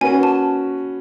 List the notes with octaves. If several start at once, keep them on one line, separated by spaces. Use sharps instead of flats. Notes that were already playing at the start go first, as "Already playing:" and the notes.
A#3 C#4 F#4 B4 G#5
A5